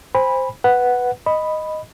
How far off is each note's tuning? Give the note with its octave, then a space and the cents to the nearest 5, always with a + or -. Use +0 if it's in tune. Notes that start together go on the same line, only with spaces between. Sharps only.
C5 +0 G#5 -35 B5 -10
B4 +0 F#5 +0
D#5 +0 B5 +0